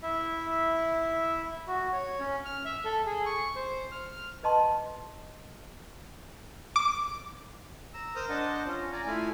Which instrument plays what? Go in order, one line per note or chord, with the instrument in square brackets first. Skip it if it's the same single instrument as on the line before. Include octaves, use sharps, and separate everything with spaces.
[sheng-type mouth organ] E4 E5
F#4
C#5
C#4
F6
E5
A4
G#4
C#6
C5
F6
[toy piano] B4 D#5 A5 C6
[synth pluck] D6
[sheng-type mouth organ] A#5 E6
A#4 C5 D#6 F6
D4 C5 D#5 F#5 A5
C#4 F4
D5 G#5 A#5
A3 E4 F4 G#5